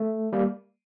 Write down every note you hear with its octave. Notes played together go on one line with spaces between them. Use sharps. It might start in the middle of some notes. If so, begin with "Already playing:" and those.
Already playing: A3
G3 A#3